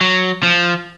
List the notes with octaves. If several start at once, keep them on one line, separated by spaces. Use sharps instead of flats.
F#3
F3